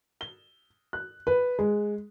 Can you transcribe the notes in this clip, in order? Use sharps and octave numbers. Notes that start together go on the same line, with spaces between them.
G7
F#6
B4
G#3